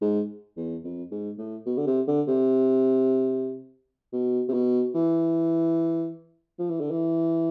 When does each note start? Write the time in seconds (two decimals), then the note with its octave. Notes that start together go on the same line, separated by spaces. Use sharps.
0.01 G#2
0.57 E2
0.84 F2
1.11 G#2
1.38 A2
1.66 B2
1.77 D3
1.87 C3
2.07 D3
2.28 C3
4.13 B2
4.48 C3
4.54 B2
4.95 E3
6.59 F3
6.70 E3
6.80 D3
6.91 E3